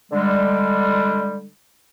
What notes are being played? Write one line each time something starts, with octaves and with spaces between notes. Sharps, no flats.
D3 G3 G#3